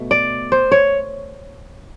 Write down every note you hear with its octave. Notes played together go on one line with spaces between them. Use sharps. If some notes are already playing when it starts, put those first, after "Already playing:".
Already playing: B2 A3
D5
C5
C#5